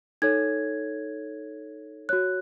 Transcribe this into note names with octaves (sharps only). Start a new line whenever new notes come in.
D#4 A4 C#5 G#6
F#4 C#5 F#6